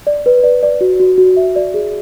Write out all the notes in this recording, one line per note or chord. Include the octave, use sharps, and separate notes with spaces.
D5
B4
D5
D5
F#4
F#4
F#4
E5
D5
G#4